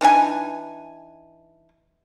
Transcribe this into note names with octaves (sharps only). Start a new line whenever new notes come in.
E3 D4 D#4 G#5